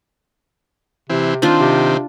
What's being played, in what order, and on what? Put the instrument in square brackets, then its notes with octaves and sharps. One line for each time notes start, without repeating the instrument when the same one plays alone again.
[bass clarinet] C3 [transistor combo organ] E3 C4
[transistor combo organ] D#3 C4 [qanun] D4 F4
[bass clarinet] C3